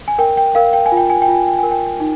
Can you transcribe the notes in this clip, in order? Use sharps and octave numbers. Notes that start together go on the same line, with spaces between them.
G#5
A#4 G5
G5
A#4 F5
G5
G#5
F4
G5
G#5
G5
F4
G#5
G5
A#4 G#5
G5
D#4